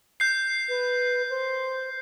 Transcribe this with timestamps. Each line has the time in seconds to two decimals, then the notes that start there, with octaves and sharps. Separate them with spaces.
0.20 G6 C7
0.69 B4
1.30 C5